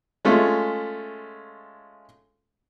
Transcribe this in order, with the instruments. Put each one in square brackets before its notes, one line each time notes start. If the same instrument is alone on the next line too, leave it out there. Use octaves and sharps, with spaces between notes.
[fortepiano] G#3 A3 C#4 F4